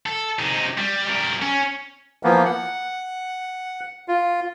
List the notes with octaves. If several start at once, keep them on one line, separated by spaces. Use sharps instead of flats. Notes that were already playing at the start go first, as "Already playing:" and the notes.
A4
C3 D#4
G3
G3 A#4
C#4
E3 F3 A#3 B3
F#5
F4